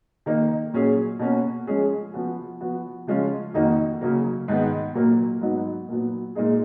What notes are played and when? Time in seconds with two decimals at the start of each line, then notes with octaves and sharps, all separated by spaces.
0.26 D#3 A#3 D#4
0.74 A#2 F#3 C#4 G#4
1.19 B2 A#3 C#4 F#4
1.67 F3 G#3 C#4 G#4
2.14 F3 B3 F#4
2.61 F3 B3 F#4
3.07 C#3 F3 G#3 C#4 F4
3.54 F2 D#3 A#3 D#4 F#4
4.01 C#3 F#3 A#3
4.48 G#2 D#3 G#3 B3
4.95 A#2 F#3 A#3
5.41 G#2 F#3 B3 D#4
5.88 A#2 F#3 B3
6.35 A#2 G#3 D#4 G#4